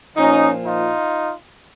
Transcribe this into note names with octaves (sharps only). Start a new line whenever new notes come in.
A#2 F3 C#4 D#4
D#4 F4